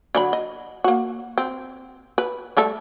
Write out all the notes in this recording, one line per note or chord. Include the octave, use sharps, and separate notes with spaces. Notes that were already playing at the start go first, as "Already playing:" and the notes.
D3 F#3 B5
D#5
A#3 F#4
C4
B4
G3 A3 A4